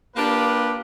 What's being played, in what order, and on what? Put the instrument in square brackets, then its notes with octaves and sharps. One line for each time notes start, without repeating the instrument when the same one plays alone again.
[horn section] A#3 D4 F4 G4 B4